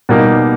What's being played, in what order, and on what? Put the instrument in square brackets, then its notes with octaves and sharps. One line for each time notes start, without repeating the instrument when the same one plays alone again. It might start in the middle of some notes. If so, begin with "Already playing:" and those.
[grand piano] B2 G3 A#3 D#4